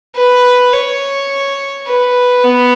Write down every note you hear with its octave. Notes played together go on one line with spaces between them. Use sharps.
B4
C#5
B4
B3